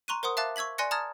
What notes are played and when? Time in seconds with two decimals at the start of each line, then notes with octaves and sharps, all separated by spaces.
0.08 A#5 C6 C#6 F#6 D#7
0.23 A#4 C5 F#5 C6 D#6
0.37 E5 F5 A5 D6 F#6 A6
0.56 C#6 E6 G#6 B6 F#7
0.78 D5 G#5 C6 F#6 A#6 C#7
0.91 A5 A#5 D#6 F6 G#6 A6